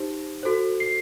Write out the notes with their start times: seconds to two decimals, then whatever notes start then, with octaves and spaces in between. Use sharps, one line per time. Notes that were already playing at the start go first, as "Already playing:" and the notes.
Already playing: D#4 G4 C5
0.43 F#4 A4 C5
0.80 C7